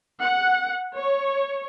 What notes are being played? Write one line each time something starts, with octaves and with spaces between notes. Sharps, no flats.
F#5
C#5